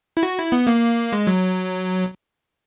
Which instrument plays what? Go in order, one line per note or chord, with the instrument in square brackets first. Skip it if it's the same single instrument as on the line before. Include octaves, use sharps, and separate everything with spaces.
[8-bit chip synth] E4
F#4
E4
B3
A#3
G#3
F#3